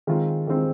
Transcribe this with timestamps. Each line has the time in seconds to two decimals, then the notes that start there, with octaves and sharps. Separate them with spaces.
0.07 D#3 G#3 C4 F4
0.47 D#3 G#3 C4 F4